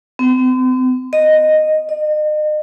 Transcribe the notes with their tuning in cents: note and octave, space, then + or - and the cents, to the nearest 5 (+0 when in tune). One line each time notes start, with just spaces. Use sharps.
C4 -40
D#5 -10
D#5 -40